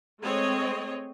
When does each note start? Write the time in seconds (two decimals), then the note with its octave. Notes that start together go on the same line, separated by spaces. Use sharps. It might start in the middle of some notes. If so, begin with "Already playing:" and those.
0.19 G#3 A3 C4 C#5 D#5